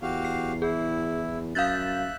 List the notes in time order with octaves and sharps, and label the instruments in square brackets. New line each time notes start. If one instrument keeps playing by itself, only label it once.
[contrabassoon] E2 [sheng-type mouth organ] F#4 G4 F5
[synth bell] C7
[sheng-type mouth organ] E4 [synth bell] G#4
[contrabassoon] F#2 [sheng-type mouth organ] E5 F#6 [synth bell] F5 G6 A6